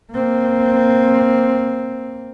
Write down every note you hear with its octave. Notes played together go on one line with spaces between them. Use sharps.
A#3 C4